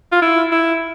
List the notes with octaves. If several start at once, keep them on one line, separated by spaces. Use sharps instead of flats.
F4
E4
E4